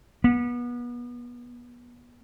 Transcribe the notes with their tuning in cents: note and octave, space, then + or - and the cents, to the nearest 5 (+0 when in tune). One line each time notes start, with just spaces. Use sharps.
B3 -30